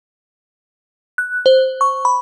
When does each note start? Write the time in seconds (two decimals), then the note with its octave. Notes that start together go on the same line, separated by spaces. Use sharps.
1.18 F#6
1.46 C5
1.81 C#6
2.05 B5